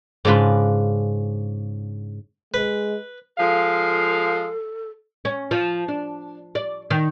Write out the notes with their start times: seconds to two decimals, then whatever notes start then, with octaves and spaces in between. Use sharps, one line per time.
0.25 G#2 C#3 D4 F4 B4
2.54 G#3 B4
3.38 F3 G#3 A4 F5
5.25 C#4
5.51 F3
5.88 D4
6.55 D5
6.90 D#3